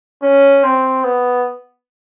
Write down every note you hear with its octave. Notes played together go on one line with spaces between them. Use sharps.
C#4
C4
B3